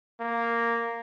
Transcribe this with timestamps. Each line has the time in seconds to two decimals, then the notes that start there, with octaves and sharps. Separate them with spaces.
0.20 A#3